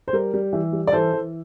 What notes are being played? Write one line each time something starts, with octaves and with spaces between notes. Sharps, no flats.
C5
G3 A#4
G3
E3
G3
D5
E3 A4 C5
E3